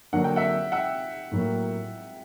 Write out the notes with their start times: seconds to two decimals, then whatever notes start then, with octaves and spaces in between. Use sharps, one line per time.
0.13 D3 F#3 A#3 D4 F#5
0.24 G5
0.36 E5 F#5
0.72 E5 F#5
1.32 A2 F#3 A#3